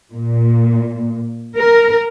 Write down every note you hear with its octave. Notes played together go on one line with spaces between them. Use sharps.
A#2
A#4